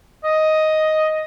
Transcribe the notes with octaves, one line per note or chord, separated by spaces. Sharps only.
D#5